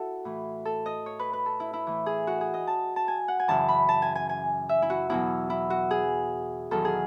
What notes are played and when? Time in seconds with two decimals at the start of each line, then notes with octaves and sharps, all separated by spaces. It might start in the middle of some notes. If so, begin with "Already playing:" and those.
Already playing: E4 F#4 A4
0.25 A2 E3
0.65 A4
0.86 D#5
1.06 C#5
1.19 B4
1.33 B4
1.46 A4
1.60 E4
1.73 E4
1.87 A2 E3
2.06 G#4
2.27 F#4
2.41 G#4
2.54 D#5
2.67 A5
2.96 A5
3.08 G#5
3.28 F#5
3.40 G#5
3.48 F#2 C#3 E3 A5
3.68 B5
3.89 A5
4.02 G#5
4.15 G#5
4.29 G#5
4.69 E5
4.82 E4
4.90 F#4
5.10 E2 B2 F#3 E4
5.50 E4
5.70 F#4
5.91 G#4
6.71 E2 D#3 F#3 A4
6.85 G#4